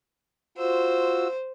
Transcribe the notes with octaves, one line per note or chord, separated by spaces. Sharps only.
F4 F#4 C5 E6